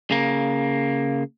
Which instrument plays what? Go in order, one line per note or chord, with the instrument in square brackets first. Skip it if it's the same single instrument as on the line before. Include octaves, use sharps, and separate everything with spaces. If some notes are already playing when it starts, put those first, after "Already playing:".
[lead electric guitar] C#3 A#3